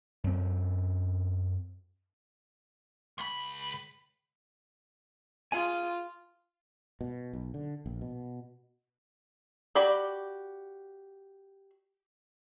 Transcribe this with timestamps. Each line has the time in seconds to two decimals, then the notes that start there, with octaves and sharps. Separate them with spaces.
0.24 F#2 C4
3.18 C#2 B5
5.52 F4 G#4 G#5
7.01 B2
7.33 B1
7.54 D3
7.86 A#1
8.01 B2
9.75 F#4 G4 D5 G5 B5